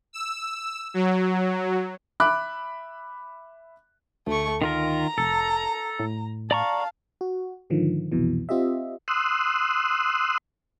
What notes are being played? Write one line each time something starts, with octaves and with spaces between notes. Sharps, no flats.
E6
F#3
E5 B5 D6 F#6
D2 A3 C#6
D#3 F4 A#4 A#5
F1 A4
A2
D5 F5 A5 A#5 C#6
F#4
G#2 D3 D#3 F3
C2 F2 B2 E3
C4 F4 G4 D#5 E5
C6 D#6 E6 F#6